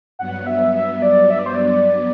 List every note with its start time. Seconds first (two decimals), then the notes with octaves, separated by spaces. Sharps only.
0.19 G2 F#3 B3 F#5
0.47 E5
0.75 E5
1.02 D5
1.30 E5
1.39 D5
1.46 C5
1.55 D5